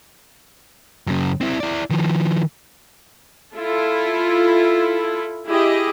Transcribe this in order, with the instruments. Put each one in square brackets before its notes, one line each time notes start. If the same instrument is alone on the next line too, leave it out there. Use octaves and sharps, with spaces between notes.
[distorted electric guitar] F#2 C#3
C4 E4
E4 D5
D#3 F3
[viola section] E4 F4 A4
E4 G4 G#4 D#5